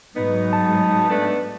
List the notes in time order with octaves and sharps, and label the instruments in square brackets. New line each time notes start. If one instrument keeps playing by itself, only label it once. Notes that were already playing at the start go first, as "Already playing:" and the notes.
[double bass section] G#2 F#3 G#3 [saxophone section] B3 D#4
[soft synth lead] A5
[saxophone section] A3 B3 D4